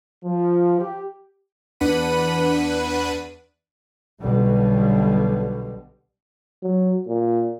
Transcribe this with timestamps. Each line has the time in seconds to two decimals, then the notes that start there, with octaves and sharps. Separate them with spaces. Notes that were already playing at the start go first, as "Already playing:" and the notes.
0.25 F3
0.80 G4
1.80 E2 D4 B4 F#5 B5 D#7
4.22 B1 B2 D3 G3
6.63 F#3
7.08 A#2